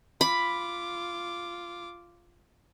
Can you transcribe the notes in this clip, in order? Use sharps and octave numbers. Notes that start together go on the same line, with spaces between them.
F4 B5 D6